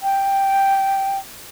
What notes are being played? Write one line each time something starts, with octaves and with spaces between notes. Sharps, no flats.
G5